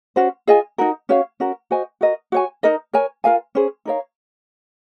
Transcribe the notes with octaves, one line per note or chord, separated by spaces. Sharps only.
C#4 F#4 C5
F4 G#4 D#5 G#5
D#4 F#4 A#4
C#4 F#4 C#5 F5
C#4 F#4 A#4
F#4 C5 D#5 G#5
F#4 A#4 D#5
F#4 C#5 G#5
D#4 A#4 D#5
A#4 C#5 G#5
F4 A#4 F5 G#5
C#4 G#4 C5
D#4 A#4 C#5 F5